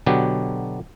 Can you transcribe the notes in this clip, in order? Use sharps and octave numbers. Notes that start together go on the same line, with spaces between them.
B2 D3 F#3 B3 G4